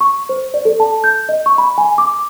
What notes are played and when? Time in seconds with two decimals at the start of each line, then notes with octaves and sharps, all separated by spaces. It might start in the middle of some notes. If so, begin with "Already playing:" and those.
0.01 C#6
0.29 C5
0.54 D5
0.65 A4
0.80 A5
1.04 G6
1.29 D#5
1.46 C#6
1.58 B5
1.78 G#5
1.98 D6